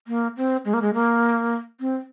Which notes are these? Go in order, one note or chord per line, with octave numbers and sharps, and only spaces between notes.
A#3
C4
G#3
A#3
G#3
A#3
C4